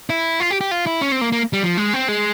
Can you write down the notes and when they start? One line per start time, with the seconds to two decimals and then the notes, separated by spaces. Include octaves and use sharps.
0.10 E4
0.40 F4
0.50 G4
0.61 G4
0.71 F4
0.87 E4
1.01 C#4
1.12 C4
1.21 A#3
1.32 A#3
1.53 G3
1.63 F3
1.77 G#3
1.93 C4
2.08 G#3